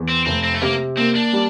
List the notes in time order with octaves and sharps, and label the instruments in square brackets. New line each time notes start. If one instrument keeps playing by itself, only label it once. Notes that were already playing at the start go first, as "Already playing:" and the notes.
Already playing: [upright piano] E2
[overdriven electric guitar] C4
[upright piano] F1 [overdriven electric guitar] C4
[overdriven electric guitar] C4
A3
[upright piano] C3 [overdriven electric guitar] A#3
[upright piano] A#3 [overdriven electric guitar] C4
[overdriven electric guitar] D4
[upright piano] G3